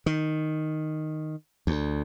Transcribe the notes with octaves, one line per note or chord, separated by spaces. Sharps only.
D#3
D2